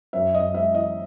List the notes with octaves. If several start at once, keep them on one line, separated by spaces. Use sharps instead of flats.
F#2 E5
F#2 D#5
G#3 E5
E3 D#5